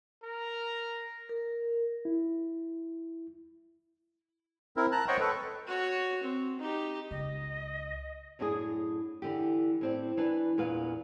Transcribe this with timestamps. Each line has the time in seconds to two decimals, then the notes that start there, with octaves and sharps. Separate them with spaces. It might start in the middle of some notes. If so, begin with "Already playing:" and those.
0.23 A#4
1.29 A#4
2.05 E4
4.77 C4 E4 A#4
4.92 A5 A#5 F#6
5.08 C5 C#5 D#5 F#5 G5 C#6
5.20 A4 B4
5.66 F#4 C#5
6.23 C4
6.59 D#4 G4
7.11 C#2 D#5
8.39 F#2 A2 D4 F4 G#4
9.22 D3 E3 G4
9.81 A2 C4 D5
10.17 E3 D4 B4
10.58 E2 A#2 B4 F5